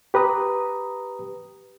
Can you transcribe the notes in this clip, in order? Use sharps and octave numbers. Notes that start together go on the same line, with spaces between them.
G4 B4 A#5 D#6